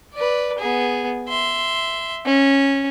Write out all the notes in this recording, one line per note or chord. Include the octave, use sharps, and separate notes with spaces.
B4 D5
B3 G#4
E5 C6
C#4